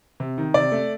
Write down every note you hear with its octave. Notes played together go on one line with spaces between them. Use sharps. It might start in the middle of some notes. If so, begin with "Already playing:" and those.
C3
D#3
C3 D5
A3